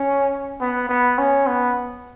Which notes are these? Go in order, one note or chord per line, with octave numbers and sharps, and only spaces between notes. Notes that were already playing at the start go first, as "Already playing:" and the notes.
Already playing: C#4
B3
B3
C#4
B3